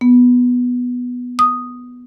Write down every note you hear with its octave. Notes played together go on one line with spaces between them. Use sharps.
B3
D#6